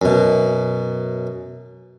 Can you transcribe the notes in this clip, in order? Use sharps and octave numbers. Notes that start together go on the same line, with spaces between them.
F#2 B2